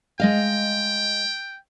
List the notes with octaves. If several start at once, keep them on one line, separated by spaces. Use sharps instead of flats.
G#3 D#5 F5 G5